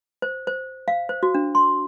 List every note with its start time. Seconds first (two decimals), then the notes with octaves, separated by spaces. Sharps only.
0.22 C5
0.47 C5
0.88 F5
1.09 C5
1.23 F#4
1.35 D4
1.55 C6